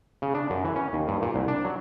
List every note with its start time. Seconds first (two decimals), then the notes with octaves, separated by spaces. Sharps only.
0.22 C#3
0.35 D4
0.50 F#2
0.64 E3
0.76 C#4
0.93 D#2
1.08 G2
1.22 A#2
1.34 C2
1.48 D4
1.65 F#3